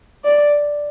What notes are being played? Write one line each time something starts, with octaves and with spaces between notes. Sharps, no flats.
D5